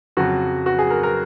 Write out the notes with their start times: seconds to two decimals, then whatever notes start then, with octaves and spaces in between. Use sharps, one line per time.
0.17 F2 C#3 F#3 F#4
0.66 F#4
0.79 G#4
0.90 A#4
1.03 A#4